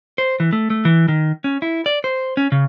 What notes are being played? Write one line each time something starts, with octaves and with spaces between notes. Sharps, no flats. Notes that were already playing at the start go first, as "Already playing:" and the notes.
C5
E3
A3
A3
E3
D#3
C#4
E4
D5
C5
C#4
C#3